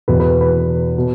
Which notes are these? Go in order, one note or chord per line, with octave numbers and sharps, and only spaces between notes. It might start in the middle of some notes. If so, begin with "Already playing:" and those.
E2 B2 B4
B4
B4
B4
B2